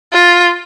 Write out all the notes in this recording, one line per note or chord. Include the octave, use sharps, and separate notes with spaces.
F4